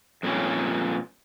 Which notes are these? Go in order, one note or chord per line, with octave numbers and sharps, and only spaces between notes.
F2 A#2 G3 C#4